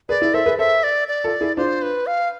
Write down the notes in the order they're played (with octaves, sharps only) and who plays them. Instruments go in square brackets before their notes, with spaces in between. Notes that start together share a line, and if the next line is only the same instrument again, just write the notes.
[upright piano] G#4 B4 [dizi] D5
[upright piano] E4 G#4
[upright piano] A4 C5 [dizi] E5
[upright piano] G#4 B4
[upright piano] A4 C5 [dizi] E5
[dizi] D5
D5
[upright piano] F4 A4
E4 G#4
[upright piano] D4 F4 [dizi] C5
[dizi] B4
F5